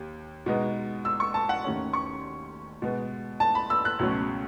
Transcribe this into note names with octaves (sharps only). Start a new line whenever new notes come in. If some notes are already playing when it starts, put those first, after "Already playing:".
Already playing: D#2
B2 G#3 B3 D#4
E6
C#6
A5
F#5
D#2 D#3 A3 C#4
C#6
B2 G#3 B3
A5
B5
E6
F#6
C#2 B2 F#3 A3 C#4